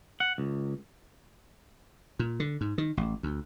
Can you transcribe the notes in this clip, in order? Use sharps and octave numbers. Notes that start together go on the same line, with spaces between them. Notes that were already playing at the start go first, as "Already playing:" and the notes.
F#5
C#2
A#2
D3
G#2
D#3
A1
D2